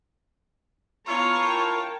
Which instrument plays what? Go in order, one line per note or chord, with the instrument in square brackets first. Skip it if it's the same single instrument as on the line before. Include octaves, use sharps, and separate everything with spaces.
[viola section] B3 [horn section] D4 E4 F4 [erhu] C#5 [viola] A#5
[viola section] A#4 G5 A5